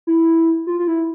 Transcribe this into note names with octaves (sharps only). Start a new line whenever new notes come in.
E4
F4
F4
E4